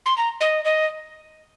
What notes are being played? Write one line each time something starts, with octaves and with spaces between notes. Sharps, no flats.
C6
A#5
D#5
D#5